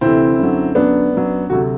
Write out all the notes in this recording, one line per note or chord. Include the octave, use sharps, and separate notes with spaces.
D2 C3 E3 C4 E4
F#2 D3 F#3
F#2 D3 F#3 B3 D4
F#2 F#3
D2 C3 F#3 F#4